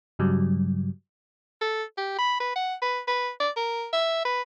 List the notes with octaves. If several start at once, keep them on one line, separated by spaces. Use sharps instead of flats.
G2 C#3 F#3 G3
A4
G4
B5
B4
F#5
B4
B4
D5
A#4
E5
B4